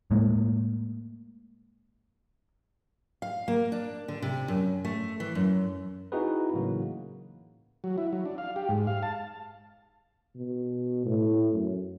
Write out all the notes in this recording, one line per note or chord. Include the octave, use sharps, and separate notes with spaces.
A2 G#3 A#3
F5
A#3
D4
D3
C3
F#2
A3
E3
F#2
C4 D#4 E4 F#4 G#4 B4
A2 C#3 E3 F#3 A#3 F#4
F#3
E4
F#3
D4
F5
G4
G#2
F5
A5
B2
A2
F#2